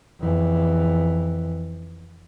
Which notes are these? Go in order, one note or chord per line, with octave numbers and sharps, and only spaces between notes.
F2 E3